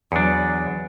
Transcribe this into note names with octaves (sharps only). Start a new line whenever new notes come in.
E2 F#3 D4